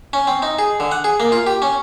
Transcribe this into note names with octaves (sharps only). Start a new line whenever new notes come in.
C#4
C4
D#4
G#4
D3
F#5
G#4
A#3
F4
G4
C#4